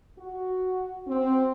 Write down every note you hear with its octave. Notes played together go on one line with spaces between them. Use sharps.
F#4
C4